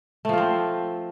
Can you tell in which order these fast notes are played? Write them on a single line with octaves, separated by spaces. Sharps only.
A3 F3 F4 C4